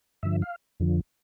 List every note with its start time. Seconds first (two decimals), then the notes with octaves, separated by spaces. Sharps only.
0.23 G2 D3 F3 E5
0.42 F5
0.80 F2 D3 F3